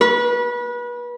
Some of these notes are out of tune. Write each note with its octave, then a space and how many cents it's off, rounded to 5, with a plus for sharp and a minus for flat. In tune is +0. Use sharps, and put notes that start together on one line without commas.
B4 -30